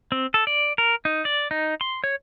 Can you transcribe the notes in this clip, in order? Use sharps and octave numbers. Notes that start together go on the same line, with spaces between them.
C4
A4
D5
A#4
D#4
D5
D#4
C6
C#5